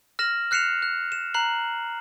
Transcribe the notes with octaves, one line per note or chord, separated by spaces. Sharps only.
F6 A#6 E7 F#7
F6 F#6 C7 C#7 E7 F7
F#6
E7
A#5 F#6 C7 F#7